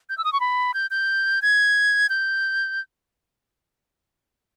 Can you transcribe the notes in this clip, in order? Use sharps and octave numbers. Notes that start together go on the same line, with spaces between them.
G6
E6
D#6
C#6
B5
G6
G6
G#6
G6